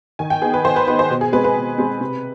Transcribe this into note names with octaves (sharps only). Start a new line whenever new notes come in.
D#3 G#5
G5
B3 D#4 G#4
B4
D#3 C5
B4
B3 D#4 B4
C5
B2
G#4
G#3 C4 B4
B4
B2
G#3 C4
C3